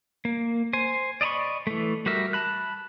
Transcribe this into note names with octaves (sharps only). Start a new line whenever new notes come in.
A#3
C5 G#5
D5 D#5 A#5 B5 C#6
E3 A3
G3 F#4 G4 A#4 E5
A5 B5 F#6